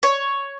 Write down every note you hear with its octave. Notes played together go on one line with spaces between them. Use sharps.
C#5